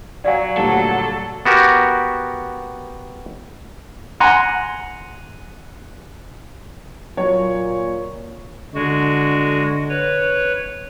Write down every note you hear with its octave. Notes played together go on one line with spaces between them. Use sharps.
F#3 D5 F5 G#5
D2 A#2 G3 A4
B3 F#4 G4 A#4
F#5 G#5 A#5 C6
A#2 F#3 C#5
D3 G#3 F#4
B4 C#5